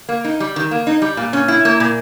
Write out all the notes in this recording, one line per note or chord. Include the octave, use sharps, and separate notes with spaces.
A#3
D#4
G3
D#3
A#3
D#4
G3
A#2
C#4
E4
A#3
A#2